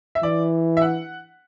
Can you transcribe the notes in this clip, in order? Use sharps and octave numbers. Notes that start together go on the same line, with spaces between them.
E5
E3 D5
E5
F#5